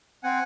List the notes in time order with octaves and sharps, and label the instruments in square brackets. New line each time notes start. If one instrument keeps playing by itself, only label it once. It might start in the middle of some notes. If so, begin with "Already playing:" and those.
[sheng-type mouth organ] C4 F#5 G#5